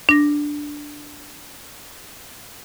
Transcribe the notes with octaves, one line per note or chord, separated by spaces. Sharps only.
D4 A#6